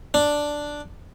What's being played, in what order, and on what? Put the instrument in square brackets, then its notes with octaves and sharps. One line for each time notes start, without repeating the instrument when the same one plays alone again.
[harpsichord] D4